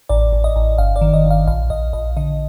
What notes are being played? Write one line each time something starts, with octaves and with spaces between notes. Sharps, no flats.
A1 D5
A1
D#5
A1
G1 F5
D5
D#3
D#5
G1
F5
A#1 F5
A#1 D#5
A#1 D#5
D3 D#5